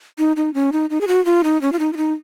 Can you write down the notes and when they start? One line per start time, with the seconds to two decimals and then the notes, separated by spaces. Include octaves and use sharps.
0.19 D#4
0.36 D#4
0.54 C#4
0.72 D#4
0.90 D#4
1.01 G#4
1.08 F#4
1.25 F4
1.44 D#4
1.62 C#4
1.72 F4
1.79 D#4
1.93 F4
1.97 D#4